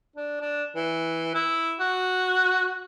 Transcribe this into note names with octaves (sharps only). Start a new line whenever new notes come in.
D4
D4
E3
E4
F#4